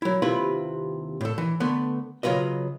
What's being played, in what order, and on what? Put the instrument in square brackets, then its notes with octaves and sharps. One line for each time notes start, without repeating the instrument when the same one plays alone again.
[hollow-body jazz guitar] F#3 E4
D#2 C3 E4 F4 B4 B5
A2 A4
E3
D3 A3 B3
C#3 F#3 F4 B4 D#5